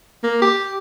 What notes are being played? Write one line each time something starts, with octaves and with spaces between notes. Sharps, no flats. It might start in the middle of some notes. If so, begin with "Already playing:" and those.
A#3
G4